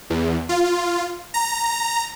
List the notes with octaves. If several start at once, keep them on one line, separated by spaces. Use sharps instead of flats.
E2
F4
A#5